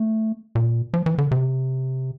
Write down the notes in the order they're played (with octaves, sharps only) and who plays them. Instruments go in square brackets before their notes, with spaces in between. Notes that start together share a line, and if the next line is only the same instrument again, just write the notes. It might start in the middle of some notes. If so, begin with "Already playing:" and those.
Already playing: [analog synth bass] A3
A#2
F3
E3
D3
C3